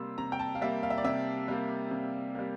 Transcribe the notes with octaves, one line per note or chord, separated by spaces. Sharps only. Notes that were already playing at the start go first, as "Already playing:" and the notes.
Already playing: C3 G3 A#3 C6 E6
C3 A#5
G5
A5
F5
G3 A#3 E5
F5
E5
D5
C3 E5
G3 A#3
C3
G3 A#3